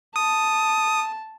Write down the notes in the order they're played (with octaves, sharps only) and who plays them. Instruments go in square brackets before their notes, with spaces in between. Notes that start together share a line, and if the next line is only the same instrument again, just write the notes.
[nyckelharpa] A5 [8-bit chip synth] D#6